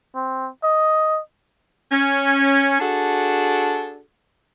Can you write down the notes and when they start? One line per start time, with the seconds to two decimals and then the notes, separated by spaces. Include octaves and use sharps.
0.15 C4
0.63 D#5
1.91 C#4
2.80 D4 F#4 G#4 A4